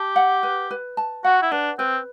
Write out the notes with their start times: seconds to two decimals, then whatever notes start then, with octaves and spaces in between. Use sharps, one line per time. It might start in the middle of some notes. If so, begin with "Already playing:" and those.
Already playing: G4 A5
0.16 F#5
0.43 B4
0.71 B4
0.97 A5
1.24 F#4 F#5
1.42 E4
1.51 D4 B4
1.79 C4 B4